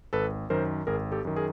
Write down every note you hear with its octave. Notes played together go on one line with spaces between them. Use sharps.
G#1 A4 B4
F#2 D#3 A#4 C5
G#1 G#4 A#4
G4 A4
F#2 D#3
G#4 A#4